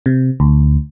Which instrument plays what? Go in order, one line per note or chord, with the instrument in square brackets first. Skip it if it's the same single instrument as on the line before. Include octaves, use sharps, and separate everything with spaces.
[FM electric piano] C3
D2